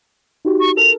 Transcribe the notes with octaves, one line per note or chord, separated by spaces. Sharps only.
D#4 F#4 G4
C#6
A4 A#4 F7